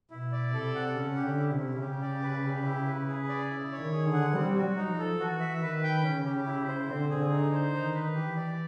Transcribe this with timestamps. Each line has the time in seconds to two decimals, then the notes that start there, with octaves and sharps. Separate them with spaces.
0.11 B2 E4
0.32 D5
0.53 C3 A4
0.75 F#5
0.95 C#3 C#4
1.17 G4
1.24 D3
1.38 E4
1.52 C3
1.59 C#4
1.80 C#3 G4
2.02 D5
2.22 B4
2.44 G4
2.65 E4
2.86 B4
3.07 G#4
3.29 D5
3.50 E4
3.71 C#5
3.78 D#3
3.93 G#4
4.07 D3
4.14 F#5
4.34 G3 C4
4.56 F#4
4.63 F#3
4.77 D#4
4.91 F3
4.98 A4
5.19 E3 F#4
5.40 E5
5.62 D#3 B4
5.83 G5
6.04 C#3 C#4
6.25 G4
6.47 E4
6.68 C5
6.88 D3 C4
7.10 G#4
7.17 D3
7.31 D#4
7.52 C5
7.73 D#3 D#4
7.94 B4
8.15 E3 G4
8.36 D5